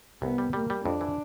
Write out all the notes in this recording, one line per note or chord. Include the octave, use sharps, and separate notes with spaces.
C2 B3
G3
G3 A#3
G3
F2 D4
E3